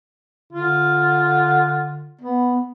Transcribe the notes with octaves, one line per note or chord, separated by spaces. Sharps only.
D3 F4
B3